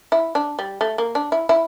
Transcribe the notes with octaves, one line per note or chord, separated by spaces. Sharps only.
E4
D4
G3
A3
A#3
D4
E4
E4